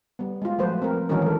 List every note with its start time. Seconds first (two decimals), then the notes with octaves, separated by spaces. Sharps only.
0.19 G3 B3
0.42 G#3 F4
0.59 F3 F#3 A3 B4 C5
0.82 C4 A#4
1.09 D#3 E3 F#3 G#3 C#4 A#4
1.22 A4 A#4